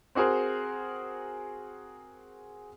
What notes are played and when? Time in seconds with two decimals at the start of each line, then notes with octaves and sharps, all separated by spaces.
0.15 C4 F#4 G#4 A#4 C5